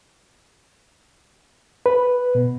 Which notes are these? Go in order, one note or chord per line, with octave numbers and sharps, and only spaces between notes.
B4
B2